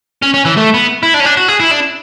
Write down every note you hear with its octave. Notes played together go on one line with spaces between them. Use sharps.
C#4
C#4
E3
A3
B3
E4
D4
C#4
D4
F#4
G#4
E4
D4